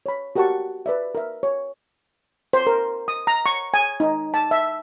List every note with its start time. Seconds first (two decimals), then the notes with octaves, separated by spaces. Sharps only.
0.06 C#5 B5
0.36 F#4 G4 A#4 F#5 A5 C#6
0.86 B4 D5 E5
1.15 A#4 E5
1.43 C#5
2.53 C5
2.67 A#4
3.08 D#6
3.27 A#5
3.46 C#6
3.74 G#5
4.00 D#4
4.34 A5
4.51 E5